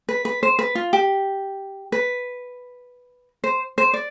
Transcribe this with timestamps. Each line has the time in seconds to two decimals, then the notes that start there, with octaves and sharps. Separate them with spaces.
0.09 B4
0.25 B4
0.43 C5
0.59 B4
0.75 F4
0.93 G4
1.92 B4
3.44 C5
3.78 C5
3.94 D5